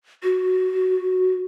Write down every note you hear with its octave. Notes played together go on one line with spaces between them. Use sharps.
F#4